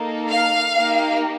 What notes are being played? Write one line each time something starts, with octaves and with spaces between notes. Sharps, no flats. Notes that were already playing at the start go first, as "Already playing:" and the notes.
Already playing: A#3 D#4 A4
F5
A#3 D#4 G4